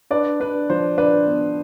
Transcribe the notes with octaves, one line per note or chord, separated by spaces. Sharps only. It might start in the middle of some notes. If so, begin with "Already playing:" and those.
D4 B4 D5
D4 B4
F3 C5
D4 B4 D5
B3